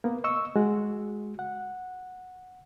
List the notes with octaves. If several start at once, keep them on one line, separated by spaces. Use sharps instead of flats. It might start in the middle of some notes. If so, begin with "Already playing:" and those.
A#3 B3
D#5 C#6 E6
G#3 F#4
F#5